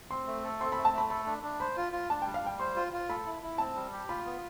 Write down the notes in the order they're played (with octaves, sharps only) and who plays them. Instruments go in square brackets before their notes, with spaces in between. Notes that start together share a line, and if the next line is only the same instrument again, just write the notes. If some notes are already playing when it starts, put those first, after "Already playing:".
[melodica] C4 [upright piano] C6
[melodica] A3
A4
[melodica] C4 [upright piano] C6
[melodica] A3 [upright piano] B5
[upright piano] A5
[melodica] A3 [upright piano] B5
[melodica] A4 [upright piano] B5
[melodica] D4
D4
[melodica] C5 [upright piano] B5
[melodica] F4
F4
[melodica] D4 [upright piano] A5
[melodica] G3 [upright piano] G5
[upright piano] F5
[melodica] G3 [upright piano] G5
[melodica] C5 [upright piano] C6
[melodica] F4
F4
[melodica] A4 [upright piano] B5
[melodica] E4
E4
[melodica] C4 [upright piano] A5
[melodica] G3
G4
[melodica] F4 [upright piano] B5
[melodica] B3